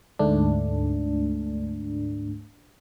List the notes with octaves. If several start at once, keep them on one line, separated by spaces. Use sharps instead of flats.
D2 G#2 A3 D4